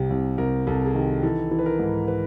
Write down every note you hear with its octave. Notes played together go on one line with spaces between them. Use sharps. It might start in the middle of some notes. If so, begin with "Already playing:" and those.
Already playing: C2 C3 G4
C2
C2 A#4
C2 A4
G#4
D#3 G4
E3 A4
E3
B4
A#4
G#2
B4